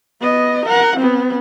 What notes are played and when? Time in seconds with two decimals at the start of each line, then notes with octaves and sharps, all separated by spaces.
0.20 B3 D#5
0.66 A#4 F#5
0.98 B3 C4